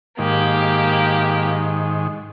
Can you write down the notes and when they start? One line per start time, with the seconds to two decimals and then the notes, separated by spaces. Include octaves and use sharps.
0.19 G#2 D#3 A#3 G4